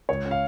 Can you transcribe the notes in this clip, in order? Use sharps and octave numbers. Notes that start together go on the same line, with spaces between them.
C#2 C#5
C#4
F5